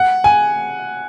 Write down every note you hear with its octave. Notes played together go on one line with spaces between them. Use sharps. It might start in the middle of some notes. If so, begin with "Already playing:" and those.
Already playing: F#5
G#5